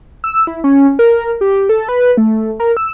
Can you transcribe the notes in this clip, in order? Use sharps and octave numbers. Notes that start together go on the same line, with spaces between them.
E6
E4
C#4
A#4
G4
A4
B4
A3
A#4
E6